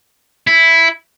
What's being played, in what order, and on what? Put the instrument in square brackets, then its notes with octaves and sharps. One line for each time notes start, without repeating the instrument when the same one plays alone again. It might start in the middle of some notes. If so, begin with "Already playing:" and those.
[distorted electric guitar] E4